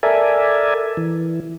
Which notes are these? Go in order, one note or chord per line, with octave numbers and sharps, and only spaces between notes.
A4 A#4 D5 E5 G#5
E3